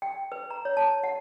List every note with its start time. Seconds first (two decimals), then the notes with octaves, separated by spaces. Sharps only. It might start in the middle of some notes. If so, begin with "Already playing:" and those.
0.02 G5
0.32 B4
0.50 A#5
0.65 C#5
0.77 A5
1.04 F#5